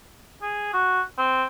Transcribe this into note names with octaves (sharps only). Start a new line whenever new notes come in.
G#4
F#4
C4